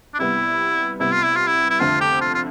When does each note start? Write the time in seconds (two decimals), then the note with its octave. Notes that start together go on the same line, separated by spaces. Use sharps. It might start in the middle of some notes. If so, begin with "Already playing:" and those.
0.14 D4
0.19 C3 G3 B3 E4
1.00 C3 G3 B3 E4
1.12 F4
1.23 E4
1.36 F4
1.47 E4
1.70 E4
1.80 F2 D3 A3 C4 F4
2.01 G4
2.21 F4
2.35 F4